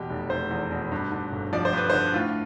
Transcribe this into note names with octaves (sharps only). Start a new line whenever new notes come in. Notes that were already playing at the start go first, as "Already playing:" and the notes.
Already playing: E2 B2 G4
F1
F1 C5
E2
B2
G2
D3
G1
F3 D5
C5
G2 B4
D3 C5
A2 F4